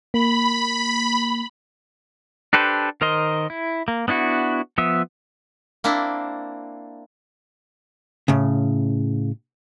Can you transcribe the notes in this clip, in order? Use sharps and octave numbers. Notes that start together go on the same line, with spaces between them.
A#3 B5
D4 G4 A4 B4 C5
D#3 A#4 C5 D#5 C6
E4
A#3
B3 D4 E4 F#4
F3 B3 E5
A#3 C4 D4 E4
A2 C#3